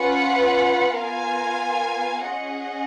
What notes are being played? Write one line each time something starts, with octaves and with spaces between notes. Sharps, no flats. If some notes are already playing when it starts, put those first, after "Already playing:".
Already playing: C#4 F4 B4 F#5
B3 F4 A#4 F5 G#5
C#4 G#4 D#5 F#5